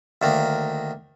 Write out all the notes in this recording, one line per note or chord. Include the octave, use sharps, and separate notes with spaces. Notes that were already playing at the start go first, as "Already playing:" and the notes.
D2 D#3 A#3